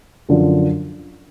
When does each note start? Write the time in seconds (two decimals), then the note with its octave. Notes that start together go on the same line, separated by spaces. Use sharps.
0.29 F#2 D3 F3